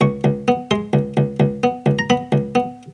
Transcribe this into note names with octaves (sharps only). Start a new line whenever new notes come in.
C#2 C#6
C#2
B3
G#3 C6
C#2
C#2
C#2
B3
C#2
A#5
B3 B5
C#2
B3